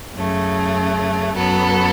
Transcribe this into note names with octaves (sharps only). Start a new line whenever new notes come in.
F#2 C#3 A3
F#2 F#3 B3 A4